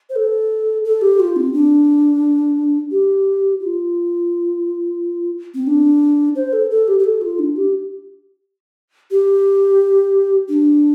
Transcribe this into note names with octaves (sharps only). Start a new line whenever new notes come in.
C5
A4
A4
G4
F4
C4
D4
G4
F4
C4
D4
C5
A4
A4
G4
G4
A4
F4
D4
G4
G4
D4